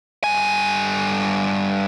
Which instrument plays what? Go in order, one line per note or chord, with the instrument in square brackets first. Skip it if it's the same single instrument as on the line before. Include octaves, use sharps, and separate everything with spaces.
[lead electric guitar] G2 G#5